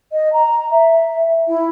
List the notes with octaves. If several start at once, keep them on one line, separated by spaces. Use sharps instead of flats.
D#5
A#5
E5
E4